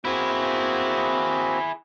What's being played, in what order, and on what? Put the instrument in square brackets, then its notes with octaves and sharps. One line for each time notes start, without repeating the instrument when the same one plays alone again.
[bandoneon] A#3 C4 F#4 [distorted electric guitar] E4 G#4